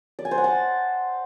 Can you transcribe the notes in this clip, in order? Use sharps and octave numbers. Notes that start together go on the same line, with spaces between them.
D5
G#5
C5
F#5
A5